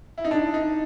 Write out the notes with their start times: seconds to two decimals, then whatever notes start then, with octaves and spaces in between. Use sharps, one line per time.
0.18 E4
0.25 D#4
0.31 D4
0.54 D#4